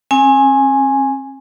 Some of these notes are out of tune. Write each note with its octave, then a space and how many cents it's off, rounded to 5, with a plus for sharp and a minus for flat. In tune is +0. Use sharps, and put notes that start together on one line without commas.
C4 +45 G#5 +0